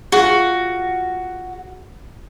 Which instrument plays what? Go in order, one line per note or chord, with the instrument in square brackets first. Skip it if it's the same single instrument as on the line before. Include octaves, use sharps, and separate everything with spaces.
[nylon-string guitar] F4 G#4 [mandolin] F#4